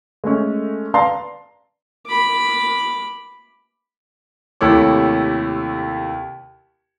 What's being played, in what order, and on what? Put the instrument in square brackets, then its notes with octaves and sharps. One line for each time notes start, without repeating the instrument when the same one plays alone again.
[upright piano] G#3 A3 C#4
B4 D5 F5 A5 A#5 C6
[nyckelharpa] B5 D6
[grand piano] D#2 C3 A3 E4 C#5 D6